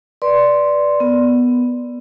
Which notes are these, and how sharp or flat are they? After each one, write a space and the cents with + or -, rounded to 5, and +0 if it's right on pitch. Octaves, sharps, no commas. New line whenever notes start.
B4 -20 D5 +0 C6 +0
B3 +0 A#4 -10